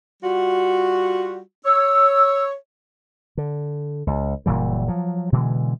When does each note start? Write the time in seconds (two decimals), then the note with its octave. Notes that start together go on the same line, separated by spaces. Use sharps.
0.23 G3 F4 F#4
1.66 C#5 E6
3.37 D3
4.07 C#2
4.46 F#1 A#2 E3 G3
4.88 F3 F#3
5.32 B2 D3 E3 G#3